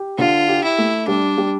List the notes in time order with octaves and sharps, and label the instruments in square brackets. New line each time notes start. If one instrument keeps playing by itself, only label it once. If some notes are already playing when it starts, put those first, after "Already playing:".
Already playing: [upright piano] G4
[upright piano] D3 [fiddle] F4
[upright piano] G4
[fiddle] E4
[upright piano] A3
[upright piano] G3 [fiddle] D4
[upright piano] G3